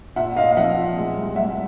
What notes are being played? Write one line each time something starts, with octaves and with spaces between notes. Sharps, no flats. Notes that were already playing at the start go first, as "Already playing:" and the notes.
A#2 E5 F#5
A#2 D#5 F5
F5
F3 E5 F#5
A#2
G#3
C2
C2 E5 F#5